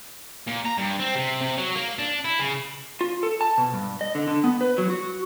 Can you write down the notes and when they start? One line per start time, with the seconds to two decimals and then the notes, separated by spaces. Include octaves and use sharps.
0.47 A#2
0.65 A#5
0.78 G2
0.99 C4
1.15 C3
1.41 C3
1.58 F#3
1.75 A#3
1.99 D4
2.25 E4
2.39 C#3
3.01 F4
3.23 A4
3.41 A5
3.58 B2
3.74 G2
4.01 D#5
4.15 D3
4.28 D3
4.44 B3
4.61 B4
4.78 F#3
4.90 F#4